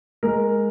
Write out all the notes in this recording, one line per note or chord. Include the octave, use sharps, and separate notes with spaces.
G#3 A#4